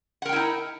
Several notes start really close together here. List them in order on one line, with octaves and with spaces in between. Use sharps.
F#5 A#4 G5 E4 D#4